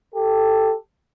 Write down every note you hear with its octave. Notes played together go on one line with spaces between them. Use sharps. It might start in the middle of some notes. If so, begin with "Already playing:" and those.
G4 A4